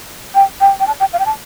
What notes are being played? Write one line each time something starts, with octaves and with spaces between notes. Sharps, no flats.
G5
G5
G5
A5
G5
F5
G5
A5